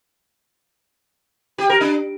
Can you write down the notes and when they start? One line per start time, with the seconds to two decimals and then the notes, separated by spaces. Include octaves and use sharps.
1.58 G4
1.69 A#4
1.81 D4